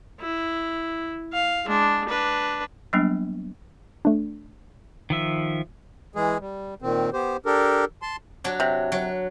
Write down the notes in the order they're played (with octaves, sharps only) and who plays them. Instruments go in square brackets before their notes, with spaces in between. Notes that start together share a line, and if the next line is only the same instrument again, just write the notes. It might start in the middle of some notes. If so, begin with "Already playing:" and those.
[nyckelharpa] E4
F5
G#3 D4
D4 B4
[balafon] F#3 G3 A#3 B3 D4
[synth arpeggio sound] A3 D4
[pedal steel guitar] D#3 F3 E5
[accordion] E3 G#3 G#4
G3
A#2 D#3 C4
B3 G4 C5
D4 G4 A4 A#4
A5 C6
[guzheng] F#3 D4
[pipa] C3
[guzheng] F#3